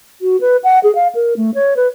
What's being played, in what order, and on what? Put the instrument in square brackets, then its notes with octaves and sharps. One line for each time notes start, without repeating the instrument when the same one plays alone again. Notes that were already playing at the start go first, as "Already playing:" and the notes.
[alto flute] F#4
B4
F#5
G#4
F5
A#4
A3
C#5
B4